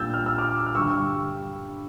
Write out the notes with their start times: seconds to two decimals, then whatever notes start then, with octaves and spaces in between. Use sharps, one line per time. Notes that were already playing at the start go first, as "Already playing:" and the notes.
Already playing: A#2 G3 D4 E6 G6 A6
0.14 F6
0.26 E6
0.38 D6 F6
0.66 F6
0.75 G2 D3 G3 C#6 E6